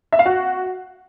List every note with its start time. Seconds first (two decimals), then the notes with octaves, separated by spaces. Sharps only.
0.13 E5
0.19 F5
0.26 F#4